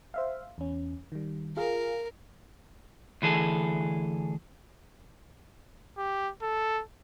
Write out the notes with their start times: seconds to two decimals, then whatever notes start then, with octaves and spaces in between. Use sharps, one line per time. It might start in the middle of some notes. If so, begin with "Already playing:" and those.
0.14 C5 E5 F5
0.58 E2 C#4
1.12 D#3 G3
1.57 F4 G#4 A#4 F5
3.22 D2 E3 G#4 A4
5.98 G4
6.42 A4